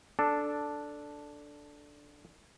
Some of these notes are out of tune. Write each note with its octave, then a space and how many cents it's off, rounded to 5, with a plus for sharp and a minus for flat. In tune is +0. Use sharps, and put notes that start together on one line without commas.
D4 +0 A4 +0